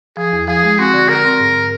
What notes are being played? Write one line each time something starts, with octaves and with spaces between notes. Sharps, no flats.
F3 G#4
E2
F3 G#4
G#3
C4 F#4
D3
D3 A#4
C4
G#2